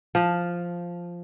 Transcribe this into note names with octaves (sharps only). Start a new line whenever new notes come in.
F3